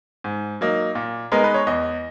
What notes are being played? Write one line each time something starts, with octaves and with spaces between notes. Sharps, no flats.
G#2
F#3 A#3 D#4
A#2
G#3 B3 D#4 A#4
B4
C#5
E2 D#5